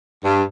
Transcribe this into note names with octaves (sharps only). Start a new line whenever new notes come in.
G2